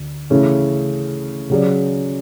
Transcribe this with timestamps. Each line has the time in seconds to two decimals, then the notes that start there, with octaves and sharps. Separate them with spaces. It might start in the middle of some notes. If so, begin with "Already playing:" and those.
Already playing: D2 D4
0.30 C#3 E3 A3 C#4
1.50 C#3 F#3 C#4 G#4 D5